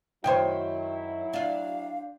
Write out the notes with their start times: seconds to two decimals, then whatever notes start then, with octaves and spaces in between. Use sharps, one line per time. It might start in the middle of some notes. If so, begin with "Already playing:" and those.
0.24 F#2 D#3 F#3 E4 C5 C#5 G5
1.33 D4 F4 F5